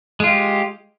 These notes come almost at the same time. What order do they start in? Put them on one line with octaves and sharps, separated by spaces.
G#3 F4 G4